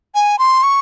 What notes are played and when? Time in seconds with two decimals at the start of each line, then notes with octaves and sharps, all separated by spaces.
0.15 G#5
0.39 C6
0.63 C#6